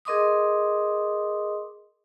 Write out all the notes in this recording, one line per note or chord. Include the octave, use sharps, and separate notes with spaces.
G#4 A#4 D#5 C6 D6 D#6